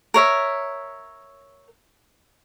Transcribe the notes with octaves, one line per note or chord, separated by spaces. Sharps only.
A#4 C#5 E5